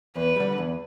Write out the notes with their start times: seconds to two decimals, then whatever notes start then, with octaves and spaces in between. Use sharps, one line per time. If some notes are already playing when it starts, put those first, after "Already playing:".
0.16 E2 B4
0.36 D3 G3
0.58 E2